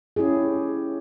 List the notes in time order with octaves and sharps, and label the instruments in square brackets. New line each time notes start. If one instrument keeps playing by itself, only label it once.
[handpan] C#4 E4 G4 G#4